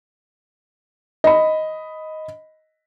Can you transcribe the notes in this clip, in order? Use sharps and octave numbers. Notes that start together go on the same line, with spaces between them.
D#5 B5